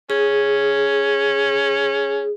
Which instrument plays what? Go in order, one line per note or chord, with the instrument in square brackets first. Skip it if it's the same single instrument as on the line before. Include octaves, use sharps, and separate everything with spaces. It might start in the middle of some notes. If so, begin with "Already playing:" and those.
[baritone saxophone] C#4 [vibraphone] G#4